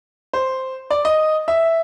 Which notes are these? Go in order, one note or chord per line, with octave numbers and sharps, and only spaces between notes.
C5
D5
D#5
E5